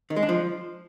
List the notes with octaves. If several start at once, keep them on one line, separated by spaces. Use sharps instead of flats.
D#3
G#3
D4
F3